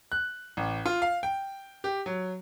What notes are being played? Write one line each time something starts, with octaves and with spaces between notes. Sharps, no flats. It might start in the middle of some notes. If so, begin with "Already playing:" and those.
F#6
A1
F4
F5
G5
G4
F#3